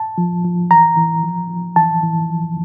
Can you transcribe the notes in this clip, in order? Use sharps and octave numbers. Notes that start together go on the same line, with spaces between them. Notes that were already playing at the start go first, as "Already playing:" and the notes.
Already playing: A5
F3
F3
E3 A#5
E3
F3
F3
E3 A5
E3
F3